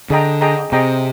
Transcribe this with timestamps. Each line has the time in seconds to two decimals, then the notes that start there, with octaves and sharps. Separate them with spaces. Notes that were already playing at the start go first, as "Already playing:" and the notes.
0.10 D3 G#4 D#5 G5 A#5
0.41 G#4 D#5 G5 A#5
0.72 C3 G#4 D#5 G5 A#5